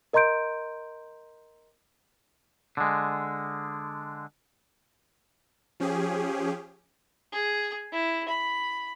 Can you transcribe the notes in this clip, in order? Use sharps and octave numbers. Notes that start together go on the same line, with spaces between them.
A#4 D#5 A#5 C6 G6 D7
D3 G#3
F3 C#4 G4 G#4
G#4
E4
B5